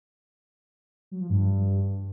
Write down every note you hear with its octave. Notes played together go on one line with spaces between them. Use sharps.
F#3
F3
G2